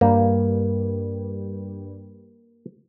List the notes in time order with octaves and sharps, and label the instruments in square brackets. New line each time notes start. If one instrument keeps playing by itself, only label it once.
[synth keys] G2 [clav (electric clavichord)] A#3